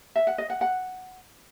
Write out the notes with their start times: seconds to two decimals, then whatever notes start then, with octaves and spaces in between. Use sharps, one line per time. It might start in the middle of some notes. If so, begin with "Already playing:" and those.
0.16 E5
0.27 F#5
0.38 D#5
0.50 F#5
0.61 F#5